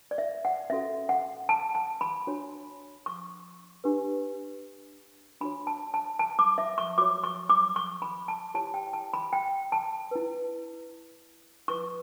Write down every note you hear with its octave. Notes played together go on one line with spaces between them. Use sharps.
D5
E5
F#5
C#4 F#4 A4 E5
F#5
A5
A5
B5
D4 F#4 C#5
C#6
D4 G4 B4
D4 F#4 C#5 B5
A5
A5
A5
D6
E5
C#6
F#4 C#5 D6
C#6
D6
C#6
B5
A5
E4 G4 C#5 A5
G5
A5
B5
G5
A5
E4 B4
E4 B4 C#6